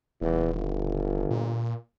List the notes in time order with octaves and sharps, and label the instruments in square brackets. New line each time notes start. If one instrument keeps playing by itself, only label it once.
[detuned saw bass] D#1 [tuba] E2
[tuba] G1
[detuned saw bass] A#2